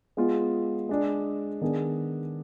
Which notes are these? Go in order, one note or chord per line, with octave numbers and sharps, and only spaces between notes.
G#3 B3 F4 G#4
G#3 D4 G#4
D#3 B3 D4 G#4